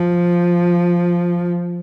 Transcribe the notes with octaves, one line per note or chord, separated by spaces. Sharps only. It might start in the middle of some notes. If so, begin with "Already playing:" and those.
Already playing: F3